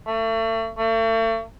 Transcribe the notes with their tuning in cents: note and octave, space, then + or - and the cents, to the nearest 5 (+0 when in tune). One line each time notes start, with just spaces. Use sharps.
A3 +35
A3 +40